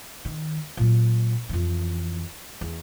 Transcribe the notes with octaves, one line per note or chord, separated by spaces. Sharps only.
D#3
A#2 F#3
F2 E3
E2